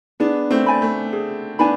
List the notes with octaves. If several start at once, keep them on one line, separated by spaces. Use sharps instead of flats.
B3 D4 G#4
A3 C4
D5 G#5 B5
A3
G#4
B3 D4 G#5 B5